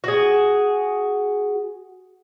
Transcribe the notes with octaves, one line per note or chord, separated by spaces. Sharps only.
F#4 G#4